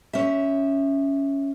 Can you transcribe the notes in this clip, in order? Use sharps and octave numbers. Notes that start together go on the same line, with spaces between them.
C#4 E5